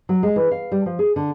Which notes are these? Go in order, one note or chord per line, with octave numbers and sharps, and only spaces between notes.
F#3
G#3
E3
F5
G3
F3
G#4
D3